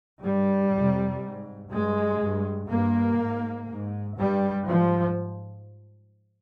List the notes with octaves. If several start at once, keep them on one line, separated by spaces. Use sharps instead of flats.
G2 G3
F2 C3
G#2
G2 G#3
G2
G2 A#3
G#2
G#2
G2 G3
G#2 F3